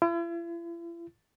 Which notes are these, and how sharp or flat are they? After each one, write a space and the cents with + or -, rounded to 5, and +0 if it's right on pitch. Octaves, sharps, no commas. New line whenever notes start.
E4 +45